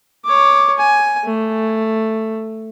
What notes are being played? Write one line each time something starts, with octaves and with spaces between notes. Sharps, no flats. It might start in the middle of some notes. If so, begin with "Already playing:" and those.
C#5 D6
G#5
A3